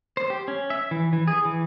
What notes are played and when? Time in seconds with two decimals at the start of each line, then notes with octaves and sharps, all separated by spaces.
0.17 C5
0.30 G4
0.48 C#4
0.70 E5
0.91 E3
1.13 E3
1.28 G#4
1.45 E3